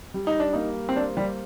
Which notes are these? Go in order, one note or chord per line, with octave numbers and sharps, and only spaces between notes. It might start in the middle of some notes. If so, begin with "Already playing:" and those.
G3
D#4
D4
A#3 D#4
C4
D4 C5
G3